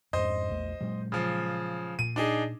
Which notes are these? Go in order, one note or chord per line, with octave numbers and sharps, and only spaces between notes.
F2 G#2 C5 D#5
A#1 E2 A3
A#2 F#3 G#3
C#3 F3
A#2 D#7
D4 D#4 G#4